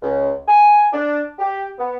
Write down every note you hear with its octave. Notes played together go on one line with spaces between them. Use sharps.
C#2
G#5
D4
G4
B3